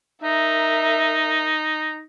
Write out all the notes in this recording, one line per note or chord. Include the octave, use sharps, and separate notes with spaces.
D#4 A#4 E5